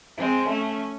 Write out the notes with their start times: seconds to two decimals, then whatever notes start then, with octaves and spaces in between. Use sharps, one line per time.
0.17 G#3 C4
0.48 A3 C#4